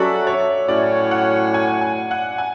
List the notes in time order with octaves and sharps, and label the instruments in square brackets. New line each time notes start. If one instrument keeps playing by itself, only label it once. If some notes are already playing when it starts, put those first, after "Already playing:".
Already playing: [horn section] F#3 C#4 F#4 A4 [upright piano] D5 E5
[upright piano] C#5
[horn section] A2 F#3 C#4 F#4 C#5 [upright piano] D5
[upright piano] F#5
G#5
G#5
F#5
G#5